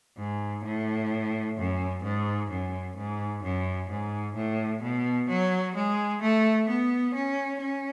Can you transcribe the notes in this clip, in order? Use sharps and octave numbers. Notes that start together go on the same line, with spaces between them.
G#2
A2
F#2
G#2
F#2
G#2
F#2
G#2
A2
B2
F#3
G#3
A3
B3
C#4
C#4